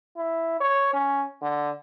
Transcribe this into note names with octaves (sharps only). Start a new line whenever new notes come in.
E4
C#5
C#4
D3